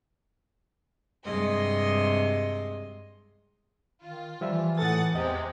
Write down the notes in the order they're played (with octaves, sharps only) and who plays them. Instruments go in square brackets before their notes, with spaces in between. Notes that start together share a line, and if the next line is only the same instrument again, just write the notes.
[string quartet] G2 C3 G#3 D#5 C6
[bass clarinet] D#3 [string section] F4
[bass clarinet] E3 [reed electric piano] F3 G3 E5
[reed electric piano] A2 A4 [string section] F#5 D#6 A6
[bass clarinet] E2 [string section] C3 G#3 G4 [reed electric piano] D#5